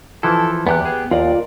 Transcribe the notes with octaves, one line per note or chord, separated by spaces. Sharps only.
E3 F3 E4 A4
E2 B3 G4 F#6
G#4
D#2 F4 A#4 D5